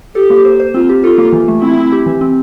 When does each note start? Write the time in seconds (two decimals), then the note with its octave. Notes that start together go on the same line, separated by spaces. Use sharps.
0.15 G4 A4
0.30 A#3
0.45 C5
0.60 C5
0.74 C4 F4
0.89 G4
1.03 F4 A4
1.18 A#3
1.32 E3
1.48 A3
1.62 C4 E4
1.77 C4
1.92 G4
2.06 E3
2.21 C4